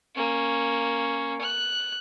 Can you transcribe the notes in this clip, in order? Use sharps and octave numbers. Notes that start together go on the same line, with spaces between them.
A#3 C#4
F#6